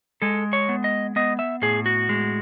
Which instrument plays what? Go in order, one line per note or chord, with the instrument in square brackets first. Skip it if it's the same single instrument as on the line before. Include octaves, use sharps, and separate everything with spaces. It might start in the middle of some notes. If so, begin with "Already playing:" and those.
[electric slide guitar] G#3 A4
C#5
B3
D#5
B3 D#5
E5
A2 G#4
F#4
G#3